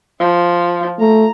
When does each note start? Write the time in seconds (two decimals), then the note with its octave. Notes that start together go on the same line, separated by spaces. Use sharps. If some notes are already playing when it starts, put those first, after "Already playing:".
0.19 F3
1.00 A3 A#5